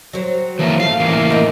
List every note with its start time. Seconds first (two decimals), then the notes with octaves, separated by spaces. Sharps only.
0.13 F#3 C4
0.59 E3 A3 A#3
0.80 A3 F4 F5
1.00 A2 E3 A#3
1.30 D#4 A#4